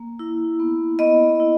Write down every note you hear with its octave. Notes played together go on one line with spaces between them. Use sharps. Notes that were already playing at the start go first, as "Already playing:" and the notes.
Already playing: A#3
E4
B3
B3 D#5
E4